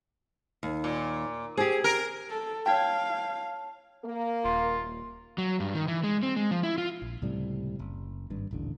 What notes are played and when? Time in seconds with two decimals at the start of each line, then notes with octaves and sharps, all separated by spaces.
0.63 D#2
0.84 A#2
1.57 C4 G4 G#4
1.84 A#4
2.30 A4
2.66 C#5 F5 G5 A5 G#6
4.03 A#3 A#4
4.45 D#1 F4
5.38 F#3
5.60 G2
5.74 D#3
5.88 E3
6.04 G#3
6.23 C4
6.36 G#3
6.51 F3
6.63 E4
6.78 F4
7.02 A#1
7.22 C#2 A2 C3 G3
7.79 F#1
8.30 G#1 G2
8.51 D#1 A1 D3